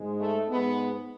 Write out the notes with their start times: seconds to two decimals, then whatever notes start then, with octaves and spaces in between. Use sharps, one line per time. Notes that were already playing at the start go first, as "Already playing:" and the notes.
Already playing: G#2 G#3
0.20 A3
0.48 G#2 G#3 B3